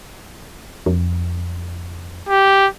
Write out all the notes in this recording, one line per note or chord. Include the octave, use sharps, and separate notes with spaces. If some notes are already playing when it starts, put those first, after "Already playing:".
F2
G4